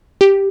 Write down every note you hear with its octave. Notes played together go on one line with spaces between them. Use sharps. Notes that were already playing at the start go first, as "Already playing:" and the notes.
G4